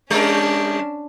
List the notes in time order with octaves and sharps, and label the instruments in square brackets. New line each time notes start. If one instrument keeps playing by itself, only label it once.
[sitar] G3 A#4 [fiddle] C#4 D4